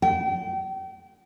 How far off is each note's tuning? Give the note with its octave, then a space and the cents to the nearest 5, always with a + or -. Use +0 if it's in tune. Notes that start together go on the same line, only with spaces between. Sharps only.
G5 -35